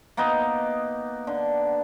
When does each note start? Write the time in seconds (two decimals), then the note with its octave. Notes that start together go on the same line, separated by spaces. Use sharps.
0.17 A#3 B3 D#4 D#5
1.27 D3